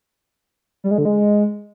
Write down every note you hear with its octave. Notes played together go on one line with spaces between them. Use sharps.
G3
G#3
D3
G#3